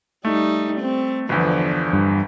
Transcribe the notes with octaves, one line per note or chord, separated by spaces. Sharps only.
G3 A3 D#4
C4
G1 E2 D3 F3 B3
G2